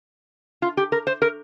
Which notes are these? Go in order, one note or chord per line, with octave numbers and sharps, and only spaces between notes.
F4
G4
A#4
C5
A#4